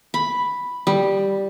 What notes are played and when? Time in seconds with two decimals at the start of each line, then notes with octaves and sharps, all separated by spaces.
0.14 B5
0.87 G3